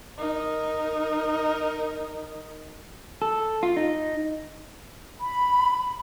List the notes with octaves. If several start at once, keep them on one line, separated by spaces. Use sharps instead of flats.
D#4 A#4
A4
F4
D#4
B5